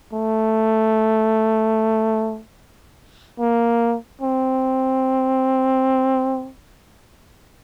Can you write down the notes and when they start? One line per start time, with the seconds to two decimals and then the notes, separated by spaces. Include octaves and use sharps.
0.13 A3
3.39 A#3
4.21 C4